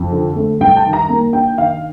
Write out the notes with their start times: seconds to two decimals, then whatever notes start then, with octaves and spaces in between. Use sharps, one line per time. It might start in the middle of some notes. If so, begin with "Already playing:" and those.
Already playing: F2
0.12 D3
0.36 A3
0.60 G2 G5
0.76 A5
0.85 D#3
0.93 A#5
1.09 A#3
1.33 D4 G5
1.57 D#3 F5